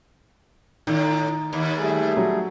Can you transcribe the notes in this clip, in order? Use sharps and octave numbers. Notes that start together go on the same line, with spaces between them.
A2 D#3
D#2
G3 A3 G#4
F#3